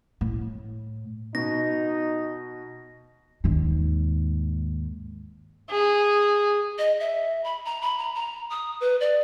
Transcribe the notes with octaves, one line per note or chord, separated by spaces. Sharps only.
A2
B2 D#4 F#4 A#6
D#2 G#2
G#4
D#5
E5
B5
A#5
B5
A#5
A#5
D#6
B4
D5